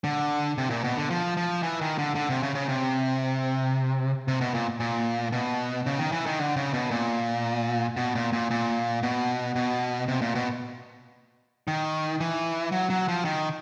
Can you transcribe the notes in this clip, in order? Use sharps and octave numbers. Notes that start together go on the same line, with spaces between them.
D3
C3
A#2
B2
D3
F3
F3
E3
D#3
D3
D3
C3
C#3
C#3
C3
C3
B2
A#2
A#2
B2
C#3
D#3
E3
D#3
D3
C#3
B2
A#2
B2
A#2
A#2
A#2
B2
B2
C3
A#2
B2
D#3
E3
F#3
F#3
F3
D#3